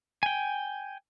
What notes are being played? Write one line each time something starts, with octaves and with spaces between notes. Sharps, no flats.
G5 G#5